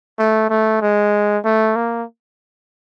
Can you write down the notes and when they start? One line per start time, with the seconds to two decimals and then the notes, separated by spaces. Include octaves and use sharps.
0.19 A3
0.50 A3
0.82 G#3
1.45 A3
1.76 A#3